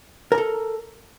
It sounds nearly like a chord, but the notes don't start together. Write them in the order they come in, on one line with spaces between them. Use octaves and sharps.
A#4 A#5 A4